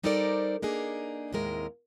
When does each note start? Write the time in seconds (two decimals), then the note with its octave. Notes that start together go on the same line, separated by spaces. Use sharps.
0.03 G3 D#4 A4 A#4 C5 D5
0.62 A#3 D4 D#4 G#4
1.32 D#2 A2 C3 G#3 A#4